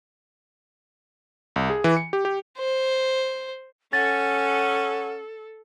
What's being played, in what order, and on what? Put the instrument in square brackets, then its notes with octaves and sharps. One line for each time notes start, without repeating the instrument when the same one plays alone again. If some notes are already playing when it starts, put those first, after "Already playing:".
[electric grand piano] C2
G#4
E3
C#7
G4
G4
[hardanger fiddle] C5
[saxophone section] C#4 [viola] A4 [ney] F#5 [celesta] A6